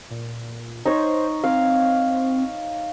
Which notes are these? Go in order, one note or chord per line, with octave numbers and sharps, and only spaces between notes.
A#2
D#4 C5 C#5
C4 F5